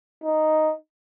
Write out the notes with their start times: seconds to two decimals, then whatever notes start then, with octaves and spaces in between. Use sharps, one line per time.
0.24 D#4